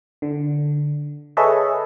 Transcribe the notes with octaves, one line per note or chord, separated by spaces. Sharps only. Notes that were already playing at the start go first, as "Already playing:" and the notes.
D3
G#4 A4 B4 C#5 D#5 E5